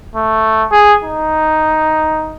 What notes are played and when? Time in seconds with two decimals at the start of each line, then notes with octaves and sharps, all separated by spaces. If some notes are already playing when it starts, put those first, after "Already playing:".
0.15 A3
0.72 G#4
1.04 D#4